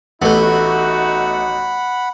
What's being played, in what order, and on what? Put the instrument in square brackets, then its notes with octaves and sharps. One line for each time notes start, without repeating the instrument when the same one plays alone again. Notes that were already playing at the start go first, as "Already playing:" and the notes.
[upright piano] A1 [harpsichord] A3 B3 [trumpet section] D#4 F#4 [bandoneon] F#5 B5